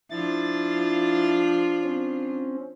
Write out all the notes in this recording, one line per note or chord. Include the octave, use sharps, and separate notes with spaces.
F3 D4 E4 F4 A6
C4 C#4